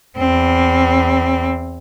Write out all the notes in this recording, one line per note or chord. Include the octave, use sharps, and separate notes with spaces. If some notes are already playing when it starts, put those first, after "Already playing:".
E2 C4